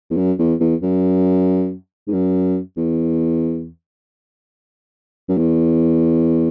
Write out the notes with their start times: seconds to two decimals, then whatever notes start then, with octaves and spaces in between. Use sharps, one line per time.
0.10 E2
0.17 F#2
0.39 E2
0.60 E2
0.82 F#2
2.07 G#2
2.12 F#2
2.77 E2
5.28 F#2
5.37 E2